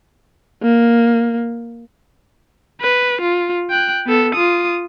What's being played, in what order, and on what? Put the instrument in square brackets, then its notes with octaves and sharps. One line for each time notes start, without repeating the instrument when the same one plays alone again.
[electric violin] A#3
B4
F4
G5 F#6
B3 A4
F4 D#6